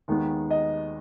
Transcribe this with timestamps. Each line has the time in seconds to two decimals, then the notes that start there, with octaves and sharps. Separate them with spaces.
0.08 D#2 D#3 G#3 B3
0.51 D#5